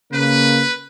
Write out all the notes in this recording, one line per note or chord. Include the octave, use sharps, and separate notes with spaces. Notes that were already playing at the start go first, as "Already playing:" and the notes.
C#3 A#3 B4